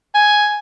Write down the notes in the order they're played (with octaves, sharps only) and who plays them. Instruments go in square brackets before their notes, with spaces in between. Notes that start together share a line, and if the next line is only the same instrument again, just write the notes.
[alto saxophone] G#5